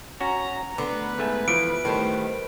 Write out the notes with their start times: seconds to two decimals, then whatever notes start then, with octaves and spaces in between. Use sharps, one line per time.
0.20 C#4 F#4 A#5
0.78 D3 B3 B4
1.18 G#2 A3 G#5
1.48 E3 F3 D7
1.85 A2 D#3 G3 C4